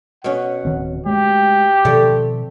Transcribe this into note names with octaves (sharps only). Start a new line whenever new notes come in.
B2 C#4 F#5
D1 D#3 C4
G#3 A3 G4
B2 D#3 F3 A3 C4 D5